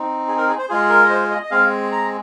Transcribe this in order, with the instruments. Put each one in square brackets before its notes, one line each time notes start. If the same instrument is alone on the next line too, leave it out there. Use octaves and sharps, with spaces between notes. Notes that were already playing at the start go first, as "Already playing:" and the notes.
Already playing: [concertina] C4 D#4
G#4
A#4
G#4
C5
G#3 F4 G#4
A#4
D#5
C5
D#5
D#5
G#3 C4 G#4 F5
A#5